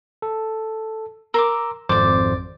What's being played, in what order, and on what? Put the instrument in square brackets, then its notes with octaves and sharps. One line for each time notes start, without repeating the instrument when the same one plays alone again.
[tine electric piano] A4
[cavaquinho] A#4 C6 D6 [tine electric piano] E6
[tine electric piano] G#1 F2 C5 [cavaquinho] D5 D6